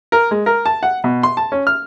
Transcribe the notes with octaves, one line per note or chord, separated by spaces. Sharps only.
A#4
G#3
A#4
A5
F#5
B2
C6
A5
C#4
F6